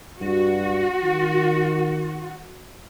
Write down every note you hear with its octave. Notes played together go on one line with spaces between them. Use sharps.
G2 F#4
D#3